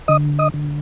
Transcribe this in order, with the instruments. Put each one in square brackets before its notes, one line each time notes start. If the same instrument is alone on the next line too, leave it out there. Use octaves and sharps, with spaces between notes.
[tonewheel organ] D3 D#5 D#6
D#5 D#6
D3